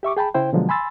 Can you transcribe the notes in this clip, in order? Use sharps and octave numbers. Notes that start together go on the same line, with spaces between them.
G4 E5 C#6 D6
G#4 G5 A5 B5
C#3 E4 C5 G5
B2 D3 F3 F#3 G#3
G#5 B5 C6 E6 A6